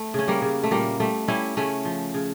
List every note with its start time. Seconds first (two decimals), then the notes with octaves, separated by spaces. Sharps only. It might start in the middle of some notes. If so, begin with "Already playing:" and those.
Already playing: A3
0.14 C#3 C#4
0.28 G3 A#3
0.42 C#3
0.63 A3
0.71 A#2 G3 A#3
1.00 G3 A3
1.28 G3 C#4 E4
1.57 C#3 A3 C#4
1.85 F3
2.14 C#3